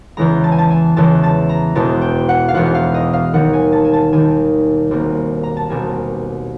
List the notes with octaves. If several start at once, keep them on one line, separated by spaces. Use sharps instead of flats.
E2 C#3 E3 G#3 A#5
A5
G#5
A5
G#5
E2 C#3 E3 G#3 A5
A5
A#5
E1 E2 B2 G#3 A5
G5
F#5
F5
E1 E2 B2 G#3 F#5
F5
D#5
F5
D#2 D#3 G3 F#5
G#5
A5
G#5
A5
D#2 D#3 G3 G#5
C2 B2 G3 A#3
A#5
A5
C2 B2 G3 A#3 G#5